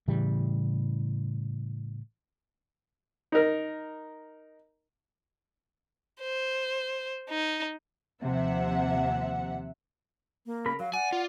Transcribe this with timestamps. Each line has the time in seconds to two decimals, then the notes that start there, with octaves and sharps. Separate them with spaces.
0.08 A2 C#3 E3 G3
3.32 D#4 A#4
6.21 C5
7.30 D#4
8.22 D#2 C3 F3 E5 F#5
10.46 A#3
10.66 C#3 A#4 B5
10.80 F#3 F5
10.94 D5 F#5 G#5
11.13 F4